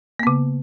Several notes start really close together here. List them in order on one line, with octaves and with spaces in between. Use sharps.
A#3 B3 C#3